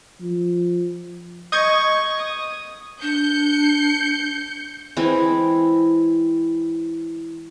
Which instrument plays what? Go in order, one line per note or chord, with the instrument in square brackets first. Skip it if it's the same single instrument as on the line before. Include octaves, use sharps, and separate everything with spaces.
[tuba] F3
[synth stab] D#5 G6 G#6 [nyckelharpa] C#6
[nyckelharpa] D#6
[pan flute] D4 [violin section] G6 C#7
[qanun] E3 G#3 C4 E4